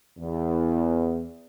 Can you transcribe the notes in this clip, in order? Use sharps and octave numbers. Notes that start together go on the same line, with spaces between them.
E2